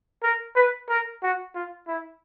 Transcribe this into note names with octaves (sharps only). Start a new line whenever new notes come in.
A#4
B4
A#4
F#4
F4
E4